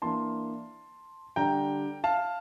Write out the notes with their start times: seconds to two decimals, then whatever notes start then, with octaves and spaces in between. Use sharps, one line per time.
0.02 E3 A#3 D4 A5 C6
1.36 D3 G3 D4 G5 A#5
2.04 F5 A5